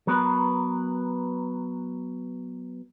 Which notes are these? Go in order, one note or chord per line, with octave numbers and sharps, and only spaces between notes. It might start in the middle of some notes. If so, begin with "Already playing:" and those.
F#3 B3 A#4 B4